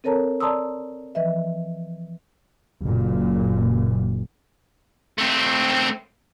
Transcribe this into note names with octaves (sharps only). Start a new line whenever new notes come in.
C4 A4 A#4 C#5 A5 A#5
D5 A5 A#5 C6 D#6 E6
E3 F3 B4 D#5 E5
F#1 A#2
A3 C4